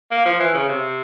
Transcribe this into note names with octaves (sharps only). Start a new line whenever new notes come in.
A#3
F3
E3
C#3
C3